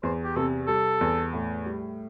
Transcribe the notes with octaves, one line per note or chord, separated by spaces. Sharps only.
E2 C5
G4
C3 A4
G3 A4
E2
A2
G3